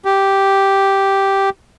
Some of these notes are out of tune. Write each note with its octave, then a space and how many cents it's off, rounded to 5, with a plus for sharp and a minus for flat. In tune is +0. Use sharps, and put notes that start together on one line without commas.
G4 -5